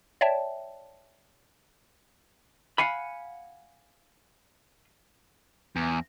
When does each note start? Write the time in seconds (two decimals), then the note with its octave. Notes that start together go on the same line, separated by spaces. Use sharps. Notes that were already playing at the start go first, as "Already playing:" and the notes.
0.21 C#5 D5 E5 G5 A5
2.78 F5 F#5 G#5 B5
5.76 E2